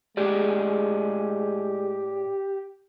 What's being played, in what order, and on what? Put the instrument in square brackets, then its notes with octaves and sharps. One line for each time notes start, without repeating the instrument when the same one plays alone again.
[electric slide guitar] A2 G#4 D5 [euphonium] G#3 [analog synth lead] G4